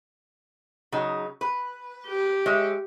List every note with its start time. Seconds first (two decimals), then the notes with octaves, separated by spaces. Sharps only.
0.92 C#3 F#3 D#4
1.41 B4
2.07 G4
2.46 G#3 C#5 E5